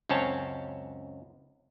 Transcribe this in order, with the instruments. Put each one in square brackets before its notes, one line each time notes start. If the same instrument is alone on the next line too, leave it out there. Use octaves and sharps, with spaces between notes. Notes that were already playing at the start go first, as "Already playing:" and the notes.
[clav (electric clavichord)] C#2 F#2 C4 C#4 C#5 A5